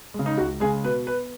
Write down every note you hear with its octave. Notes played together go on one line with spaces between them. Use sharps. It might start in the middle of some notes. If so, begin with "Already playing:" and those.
C#3 G#3
D#4
C#2 F#4
C#3 G#3 G#4
B2 B4
B3 B4